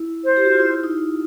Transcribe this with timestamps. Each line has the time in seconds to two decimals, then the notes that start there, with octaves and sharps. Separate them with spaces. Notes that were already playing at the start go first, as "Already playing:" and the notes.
Already playing: E4
0.25 C5
0.37 G4
0.45 F#4
0.53 F4
0.60 E4
0.71 E4
0.84 D#4